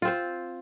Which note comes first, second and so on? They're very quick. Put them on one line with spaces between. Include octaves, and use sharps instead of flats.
F4 C4 C5